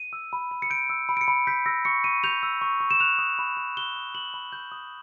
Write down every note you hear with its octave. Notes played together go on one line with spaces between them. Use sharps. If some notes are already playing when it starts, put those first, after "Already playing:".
Already playing: D#7
E6
B5
B5
C#7
G6 D7
E6
B5
D7
C#7
B5
G6 B6
E6 A#6
C#6 C#7
C#6 D#7
G6 F7
E6
C#6
C#6
E7
F#6 F7
D#6
B5
B5
F#6 G7
D#6
B5 F#7
B5
G6
D#6